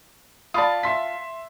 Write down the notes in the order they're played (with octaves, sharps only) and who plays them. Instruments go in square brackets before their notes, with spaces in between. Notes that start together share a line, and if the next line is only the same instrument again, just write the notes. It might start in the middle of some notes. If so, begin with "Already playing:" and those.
[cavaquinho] F4 A5 [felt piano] D5 B5 D#6
[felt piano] E5 C6 B6